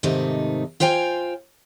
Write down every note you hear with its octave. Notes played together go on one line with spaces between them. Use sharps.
G#2 C3 D#3 A3 D#4
F4 C5 F5 G5 G#5